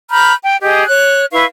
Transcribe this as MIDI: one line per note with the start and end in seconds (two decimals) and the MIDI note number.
0.10 0.33 82
0.10 0.33 83
0.10 0.33 89
0.10 0.33 91
0.42 0.55 79
0.62 0.83 67
0.62 0.83 68
0.62 0.83 75
0.87 1.26 73
0.87 1.26 90
1.32 1.46 64
1.32 1.46 71
1.32 1.46 77
1.32 1.46 85